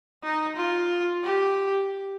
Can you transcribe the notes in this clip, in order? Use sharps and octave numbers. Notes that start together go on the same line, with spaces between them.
D#4
F4
G4